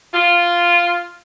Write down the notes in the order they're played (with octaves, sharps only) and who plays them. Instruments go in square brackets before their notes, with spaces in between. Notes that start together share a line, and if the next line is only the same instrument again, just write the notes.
[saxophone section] F4